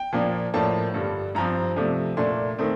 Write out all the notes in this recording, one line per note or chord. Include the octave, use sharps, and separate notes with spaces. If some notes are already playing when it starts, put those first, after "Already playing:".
Already playing: G5
A#2 F3 A#3 D4
A2 F3 A#3 D4 A5
G2 D3 G3
G2 F3 C4 A#5
C3 F3 A3 D4
A#2 A3 D4 C6
D#3 A3 C4